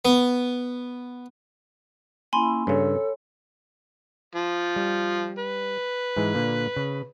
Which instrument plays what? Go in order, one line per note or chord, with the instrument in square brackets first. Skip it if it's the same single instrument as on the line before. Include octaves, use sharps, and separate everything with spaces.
[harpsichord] B3
[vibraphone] A#3 C#4 [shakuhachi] E4 [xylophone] G#5 B5 C6
[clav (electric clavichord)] G2 C#3 [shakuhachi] A4 [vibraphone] C#5
[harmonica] F3
[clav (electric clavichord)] G3
[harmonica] B4
[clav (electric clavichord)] G#2 E3 G#3
A#2 D3 A#3
C#3